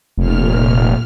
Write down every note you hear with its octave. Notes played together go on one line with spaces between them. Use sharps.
F1 A#2 F6